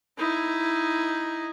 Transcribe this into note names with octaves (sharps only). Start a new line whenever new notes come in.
D#4 E4